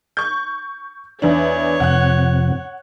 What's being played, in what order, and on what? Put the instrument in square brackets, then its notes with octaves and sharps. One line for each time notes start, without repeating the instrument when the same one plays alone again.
[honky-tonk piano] C#6 G6
[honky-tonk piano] E2 D4 [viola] C#5
[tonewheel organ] F2 C3 [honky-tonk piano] F#5 F#6